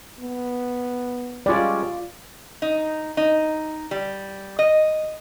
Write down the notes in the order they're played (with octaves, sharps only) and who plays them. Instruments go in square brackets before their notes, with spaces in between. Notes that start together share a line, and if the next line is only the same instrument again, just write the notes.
[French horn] B3
[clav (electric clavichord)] G3 G#3 C#4 [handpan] F4 D5
[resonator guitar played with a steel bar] D#4
D#4
G3
D#5